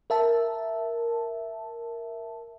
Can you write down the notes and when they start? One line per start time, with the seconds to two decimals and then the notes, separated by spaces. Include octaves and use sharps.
0.10 A#4 E5 A5